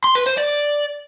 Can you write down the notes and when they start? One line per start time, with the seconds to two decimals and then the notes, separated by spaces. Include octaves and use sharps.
0.04 C6
0.15 B4
0.26 C5
0.37 D5